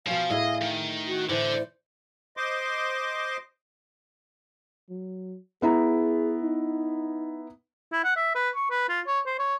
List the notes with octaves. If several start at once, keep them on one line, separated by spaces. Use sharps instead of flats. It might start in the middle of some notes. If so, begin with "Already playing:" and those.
B2 F3 C#4 F5
A2 E4 G#4 D#5
D#3
F#4
A2 D3 E3 C5
D5
C5 D#5 C6 D6
F#3
B3 E4 G#4 A#5
D#4
E4
F#5
E5
B4
C#6
B4
F4
C#5
C5
C#5